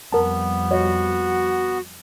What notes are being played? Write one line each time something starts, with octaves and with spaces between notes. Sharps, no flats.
F2 G3 B3 A#4 A5
F#4 C#5 D#5